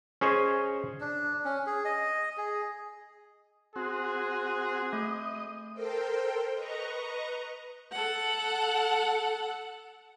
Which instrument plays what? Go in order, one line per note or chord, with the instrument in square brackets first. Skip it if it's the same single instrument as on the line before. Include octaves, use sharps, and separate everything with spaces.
[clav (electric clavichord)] C#4 G#4 C5 C#5 D#5
[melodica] D4
C#4
G#4
D#5
G#4
[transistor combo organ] C4 F#4 [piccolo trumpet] G#4
[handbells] A3 [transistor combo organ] D#5
[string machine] A4 A#4 C5 G5
B4 D#5 A#5 C#6
[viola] A4 F#5